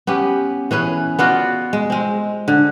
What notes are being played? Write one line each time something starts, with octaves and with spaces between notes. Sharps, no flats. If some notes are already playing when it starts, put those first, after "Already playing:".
B3 C#4 G4
E3 C#4 G#4 B4
B3 F4 F#4 D5
G#3
G#3 C4
D3